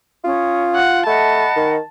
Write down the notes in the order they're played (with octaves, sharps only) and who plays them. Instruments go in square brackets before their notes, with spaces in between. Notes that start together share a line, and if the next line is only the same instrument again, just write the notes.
[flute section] C#4 D#6 [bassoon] F4
[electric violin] F#5
[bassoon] A3 [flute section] D#5 F#5 B5 [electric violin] A5
[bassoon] D#3